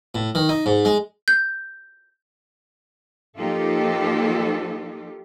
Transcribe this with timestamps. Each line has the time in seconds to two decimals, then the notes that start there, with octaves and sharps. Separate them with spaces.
0.15 A2
0.35 D#3
0.49 D#4
0.66 G#2
0.85 G#3
1.28 G6
3.37 F3 A#3 D#4 F4 G4 A4